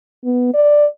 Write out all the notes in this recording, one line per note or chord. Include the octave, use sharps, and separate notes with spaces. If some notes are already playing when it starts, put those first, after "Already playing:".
B3
D5